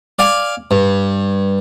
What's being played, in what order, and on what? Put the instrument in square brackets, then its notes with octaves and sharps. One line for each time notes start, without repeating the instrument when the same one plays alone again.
[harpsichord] D5 F5 G#5
G2